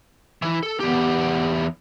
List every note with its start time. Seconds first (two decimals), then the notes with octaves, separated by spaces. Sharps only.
0.42 E3 E4
0.63 A4
0.80 E2 B3 G4